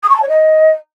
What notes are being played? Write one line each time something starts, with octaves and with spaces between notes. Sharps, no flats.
D#6
C#6
A5
C#5
D#5